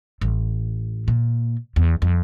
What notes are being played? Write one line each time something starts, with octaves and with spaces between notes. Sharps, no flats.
A1
A#2
E2
F2